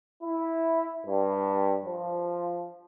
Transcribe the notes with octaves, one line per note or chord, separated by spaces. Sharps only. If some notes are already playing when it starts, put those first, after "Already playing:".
E4
G2
F3